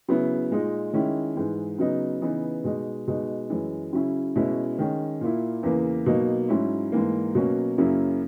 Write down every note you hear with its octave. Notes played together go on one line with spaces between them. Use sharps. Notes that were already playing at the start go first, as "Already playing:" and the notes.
C#3 F#3 B3 E4
A#2 G#3 D#4
D#3 G#3 C#4 E4
G#2 E3 G#3
C#3 F#3 B3 D#4
C#3 E3 B3 D#4
B2 G#3 D#4
B2 G#3 D#4
F#2 E3 G#3
C#3 F#3 C#4 E4
B2 G#3 C#4 E4
D#3 G#3 C#4
A#2 A#3 E4
E2 C#3 E3 A#3
B2 F#3 A#3 D#4
G#2 F#3 C#4 E4
G#2 E3 A#3
B2 F#3 A#3 C#4
F#2 C#3 F#3 A#3 E4